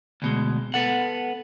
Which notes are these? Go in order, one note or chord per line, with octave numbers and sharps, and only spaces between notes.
D2 B2 G#3
B3 A4 F#5